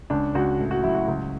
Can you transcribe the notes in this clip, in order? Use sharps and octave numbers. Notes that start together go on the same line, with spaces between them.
C#2 D4
C#2 F#4
A2
F#4
F#3 E4
F#4
C#2